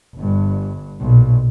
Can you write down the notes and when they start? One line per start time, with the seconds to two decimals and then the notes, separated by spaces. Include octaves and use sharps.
0.15 G1 G2
1.00 B1 A#2